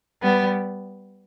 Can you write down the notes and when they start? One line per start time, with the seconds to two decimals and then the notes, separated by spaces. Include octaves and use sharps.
0.22 G3 B3